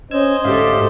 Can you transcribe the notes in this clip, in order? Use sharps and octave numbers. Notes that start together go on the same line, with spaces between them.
C#4 C5 D#5 E6 G#6
D2 G#2 G4 A4 E5 F5